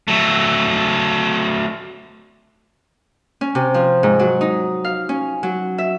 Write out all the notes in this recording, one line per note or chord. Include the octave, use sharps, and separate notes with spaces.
F#3 A3
C#4
C3
F3
G#2
F#3
D#4
F5
C#4
F#3
E5